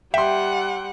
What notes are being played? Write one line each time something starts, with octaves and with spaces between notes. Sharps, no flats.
G3 E5 F#5 G5 C6